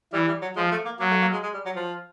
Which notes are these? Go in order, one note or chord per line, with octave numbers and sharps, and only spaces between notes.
E3 G3
G3
F#3
F3 G#3
A3
A#3
F#3 A#3
A3
A#3
G#3
G#3
G3
F#3
F3